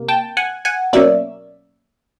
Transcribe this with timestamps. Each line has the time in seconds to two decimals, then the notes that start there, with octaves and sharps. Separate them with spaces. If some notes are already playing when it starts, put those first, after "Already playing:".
Already playing: C3 A#3
0.08 G5 A5
0.37 F#5 G#5
0.65 F#5 G#5
0.93 B2 F#3 A#3 C#4 D5 E5